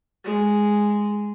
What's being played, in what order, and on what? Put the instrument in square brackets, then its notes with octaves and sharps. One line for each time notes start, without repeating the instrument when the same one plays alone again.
[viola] G#3